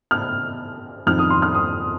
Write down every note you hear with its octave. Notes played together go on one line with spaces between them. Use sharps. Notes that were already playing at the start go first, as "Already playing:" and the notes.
F6
F2 D#3 F6
D#6
C6
F6
D#6